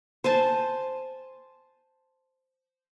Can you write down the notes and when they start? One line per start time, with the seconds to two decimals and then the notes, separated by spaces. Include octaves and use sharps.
0.24 C5 G#5 A5